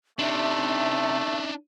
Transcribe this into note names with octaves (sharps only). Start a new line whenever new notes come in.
C3 A3 D4 D#4 E5